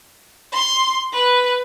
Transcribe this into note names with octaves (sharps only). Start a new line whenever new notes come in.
C6
B4